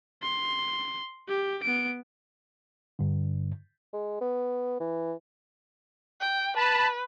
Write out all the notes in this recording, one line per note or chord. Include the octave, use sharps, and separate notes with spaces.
C6
G4
B3 D7
G2 D3
G#3
B3
E3
G5
B4 A5 B5